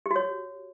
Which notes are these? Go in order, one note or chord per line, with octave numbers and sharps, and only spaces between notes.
G4
F#4
C#5